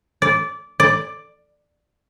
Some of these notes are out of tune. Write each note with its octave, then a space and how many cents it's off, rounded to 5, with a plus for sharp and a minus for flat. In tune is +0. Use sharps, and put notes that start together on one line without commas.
D5 -15
D5 +5